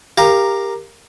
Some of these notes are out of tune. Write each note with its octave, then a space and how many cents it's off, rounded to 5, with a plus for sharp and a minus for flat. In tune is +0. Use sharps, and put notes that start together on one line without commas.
G4 +15 A#4 +0 F5 -10